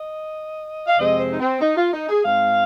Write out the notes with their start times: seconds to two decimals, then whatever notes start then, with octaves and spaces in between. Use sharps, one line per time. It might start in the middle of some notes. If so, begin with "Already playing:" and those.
Already playing: D#5
0.87 F5
0.97 F2 C3 G#3 C4 D#5
1.18 C5
1.31 D#4
1.40 C4
1.61 D#4
1.77 F4
1.93 D#4
2.09 G#4
2.25 G#2 G#3 C4 F5